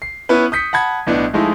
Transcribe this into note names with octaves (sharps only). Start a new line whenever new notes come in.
C7
B3 C#4 E4 B4
D#6 G6 B6 C#7
F#5 A5 B5 G#6
B1 A2 B3 D4
F3 G#3 A3 D#4 E4